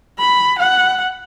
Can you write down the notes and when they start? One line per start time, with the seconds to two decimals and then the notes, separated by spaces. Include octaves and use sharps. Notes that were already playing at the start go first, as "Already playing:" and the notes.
0.18 B5
0.59 F#5